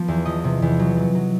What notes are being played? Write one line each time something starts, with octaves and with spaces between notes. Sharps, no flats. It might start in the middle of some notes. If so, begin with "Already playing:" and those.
Already playing: F3 B3
E2
F3 D#5
C3
E2
F#3
F#3
F#3